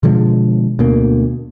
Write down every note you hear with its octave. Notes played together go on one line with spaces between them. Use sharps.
B2 D3 F3 G#3
D2 B2 A#3